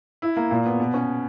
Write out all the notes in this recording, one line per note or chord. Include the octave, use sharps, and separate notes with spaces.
E4
A#3
A#2
B3
B2
C#4